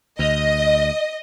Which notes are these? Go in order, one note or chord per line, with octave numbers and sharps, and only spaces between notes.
D2 D#5